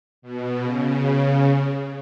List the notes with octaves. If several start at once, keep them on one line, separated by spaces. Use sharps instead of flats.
B2
C#3